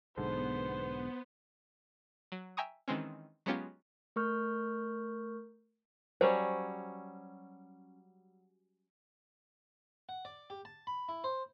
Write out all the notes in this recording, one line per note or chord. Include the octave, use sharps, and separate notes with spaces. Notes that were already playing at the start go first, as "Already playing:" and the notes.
B1 G#2 D3 B3 C5
F#3
E5 G5 G#5 A#5 C#6 D#6
D#3 E3 G#3 C4 C#4
F#3 G#3 B3 C#4 F4 G4
A3 A#4 C#6 F6 G6
F#3 G3 C#4 C5
F#5
D5
G4
A5
B5
E4
C5